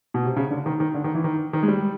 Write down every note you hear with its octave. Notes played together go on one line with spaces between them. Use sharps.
B2
C3
C#3
D3
D#3
D#3
D3
D#3
E3
D#3
D#3
G#3
G3